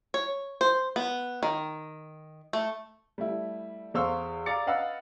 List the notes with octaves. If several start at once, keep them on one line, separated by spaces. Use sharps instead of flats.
C#5
C5
B3
D#3
A3
G3 A3 E4
E2 A4 C5 F5 C#6 E6
D5 F5 A#5 D6 A6 C#7
B4 D#5 F5 F#5 B5 E6